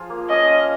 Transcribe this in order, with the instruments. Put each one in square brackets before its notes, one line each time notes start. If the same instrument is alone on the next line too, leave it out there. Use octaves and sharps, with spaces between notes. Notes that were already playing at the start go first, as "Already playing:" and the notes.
Already playing: [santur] F3 F4 G#4 F5
A#3
[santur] C#4 [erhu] D#5
[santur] F5